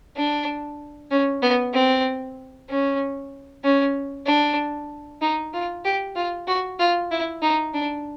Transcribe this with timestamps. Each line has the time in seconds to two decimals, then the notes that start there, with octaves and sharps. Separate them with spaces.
0.16 D4
1.11 C#4
1.42 B3
1.74 C4
2.69 C#4
3.64 C#4
4.26 D4
5.22 D#4
5.53 F4
5.85 G4
6.16 F4
6.47 F#4
6.79 F4
7.12 E4
7.43 D#4
7.74 D4